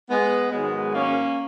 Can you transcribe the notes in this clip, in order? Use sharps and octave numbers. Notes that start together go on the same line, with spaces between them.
G#3 B3
G#2 D#3 F#3 G#3 B3
A#3 C#4